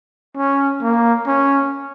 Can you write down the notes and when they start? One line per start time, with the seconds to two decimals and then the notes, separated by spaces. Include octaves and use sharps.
0.37 C#4
0.82 A#3
1.27 C#4